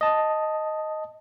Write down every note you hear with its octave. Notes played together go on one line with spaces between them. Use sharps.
D#5 A5